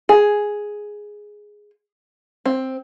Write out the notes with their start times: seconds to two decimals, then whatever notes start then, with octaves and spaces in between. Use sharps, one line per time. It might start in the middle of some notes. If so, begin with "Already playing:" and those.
0.09 G#4
2.45 C4